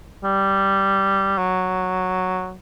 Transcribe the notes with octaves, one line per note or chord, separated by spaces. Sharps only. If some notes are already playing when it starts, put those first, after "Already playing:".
G3
F#3